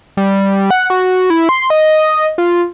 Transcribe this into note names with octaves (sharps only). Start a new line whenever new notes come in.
G3
F#5
F#4
E4
C6
D#5
F4